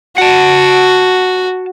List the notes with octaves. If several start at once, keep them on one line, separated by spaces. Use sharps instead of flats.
F#4 F#5 A5